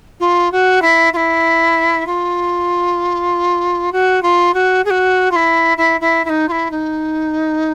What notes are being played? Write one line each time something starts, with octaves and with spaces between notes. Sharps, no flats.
F4
F#4
E4
F4
E4
F4
F#4
F4
F#4
G#4
F#4
F4
E4
E4
E4
E4
D#4
F4
E4
D#4